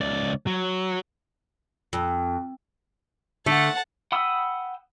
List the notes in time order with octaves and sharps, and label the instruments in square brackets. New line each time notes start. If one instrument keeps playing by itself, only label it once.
[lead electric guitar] C#2 D5
F#3
[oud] F2
[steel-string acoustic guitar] D3 [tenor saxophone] A3 [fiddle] F#5 A5
[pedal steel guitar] F#5 G5 B5 D#6 E6